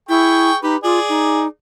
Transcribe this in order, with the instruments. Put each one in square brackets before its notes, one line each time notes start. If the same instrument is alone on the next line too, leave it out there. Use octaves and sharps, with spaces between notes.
[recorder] E4 [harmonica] G#4 G5 C#6
[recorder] D#4 [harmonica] G4 B4
[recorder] F4 [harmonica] G#4 D5
[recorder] D#4